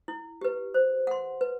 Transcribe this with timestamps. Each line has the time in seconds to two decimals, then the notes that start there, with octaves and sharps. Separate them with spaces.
0.08 E4
0.41 G4 B4
0.74 C5
1.07 F#5 C6
1.41 B4